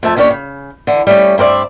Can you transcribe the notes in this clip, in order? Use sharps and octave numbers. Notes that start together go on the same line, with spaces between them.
F2 A3 E5 A5
D#2 C#4 D4 G4 C#5
C#3
D3 E3
G3 A3 C#4
G2 C4 A#4 D5 E5